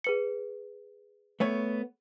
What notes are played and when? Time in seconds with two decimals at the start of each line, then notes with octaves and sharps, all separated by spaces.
0.04 G#4 B4 C#7
1.40 A3 B3 C#5